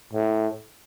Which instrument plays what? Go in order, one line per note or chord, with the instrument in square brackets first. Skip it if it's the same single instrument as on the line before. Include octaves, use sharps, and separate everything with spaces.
[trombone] A2